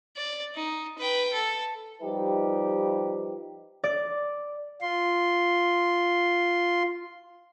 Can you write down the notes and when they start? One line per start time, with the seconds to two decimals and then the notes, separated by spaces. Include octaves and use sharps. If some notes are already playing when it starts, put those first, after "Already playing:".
0.17 D5
0.55 D#4
0.98 B4 G5
1.33 A4
2.02 F3 G3 D#4 G4 B4
3.84 D5
4.81 F4 C6